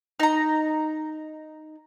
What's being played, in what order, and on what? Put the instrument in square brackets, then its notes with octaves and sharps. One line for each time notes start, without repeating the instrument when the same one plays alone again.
[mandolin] D#4 A#5